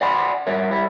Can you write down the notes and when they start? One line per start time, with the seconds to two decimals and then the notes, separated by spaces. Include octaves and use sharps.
0.01 D5 F#5 G#5 B5 C6
0.47 G3 A#4 C#5 E5
0.71 G3 E4